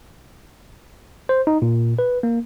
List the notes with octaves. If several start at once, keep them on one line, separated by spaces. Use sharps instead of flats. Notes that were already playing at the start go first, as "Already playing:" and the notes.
C5
D#4
A#2
B4
A#3